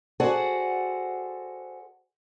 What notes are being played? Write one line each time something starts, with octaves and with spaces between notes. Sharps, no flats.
F#4 G#4 A4 C5 D5 F#5